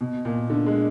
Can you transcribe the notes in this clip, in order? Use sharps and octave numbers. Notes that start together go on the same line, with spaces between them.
B2
A#2
D3
G#3